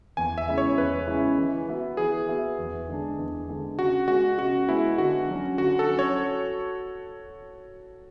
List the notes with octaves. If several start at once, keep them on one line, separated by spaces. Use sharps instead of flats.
E2 G#5
E5
C#3 G#3 C#4 E4
C#5
E2 B4
C#3 G#3 C#4 E4
E3
B3 F#4 B4 E5
E3 G#4
B3 F#4 B4 E5
E2
D3 G#3 D4
E2
D3 G#3 D4
C#3 F#4
G#3 B3 F#4
C#3 F#4
G#3 B3 E4
D3 F#4
F#3 C#4
D3 F#4
A4
F#3 C#4
C#5